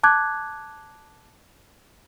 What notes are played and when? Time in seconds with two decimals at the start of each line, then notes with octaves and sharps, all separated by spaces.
0.03 A5 D6 F#6 G#6